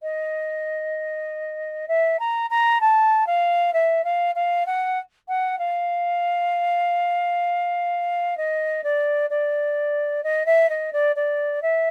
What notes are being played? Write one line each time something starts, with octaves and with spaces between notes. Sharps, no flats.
D#5
E5
A#5
A#5
A5
F5
E5
F5
F5
F#5
F#5
F5
D#5
D5
D5
D#5
E5
D#5
D5
D5
E5